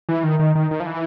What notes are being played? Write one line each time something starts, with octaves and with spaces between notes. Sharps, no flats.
E3
D#3
D#3
D#3
D#3
F3
E3